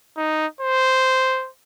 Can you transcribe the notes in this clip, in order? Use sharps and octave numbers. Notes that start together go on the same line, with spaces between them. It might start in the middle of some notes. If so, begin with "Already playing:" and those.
D#4
C5